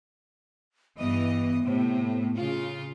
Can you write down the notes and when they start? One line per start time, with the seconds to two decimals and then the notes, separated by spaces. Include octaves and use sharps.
0.98 G2 E3 B3 D#5
1.64 A2 C3
2.36 C#3 F4